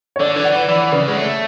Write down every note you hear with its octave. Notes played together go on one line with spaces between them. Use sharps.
C#5
D3 D5
E3
F#5
E3
E3 D5
C#3 B4
G#3
A3 C#5